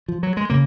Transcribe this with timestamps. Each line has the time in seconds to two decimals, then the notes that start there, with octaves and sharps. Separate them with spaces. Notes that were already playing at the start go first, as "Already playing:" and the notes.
0.08 F3
0.23 F#3
0.37 G#3
0.50 C#3 A#3